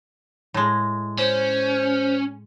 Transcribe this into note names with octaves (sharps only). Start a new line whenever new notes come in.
A2 G#3
C#4 C5